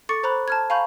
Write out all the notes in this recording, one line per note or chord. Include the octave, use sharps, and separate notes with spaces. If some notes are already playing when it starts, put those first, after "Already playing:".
A4 C#6 D6 A6 C#7
C5 A#5 B5 F#6
A5 F6 G#6
F5 G#5 A#5 B5 C#6 G6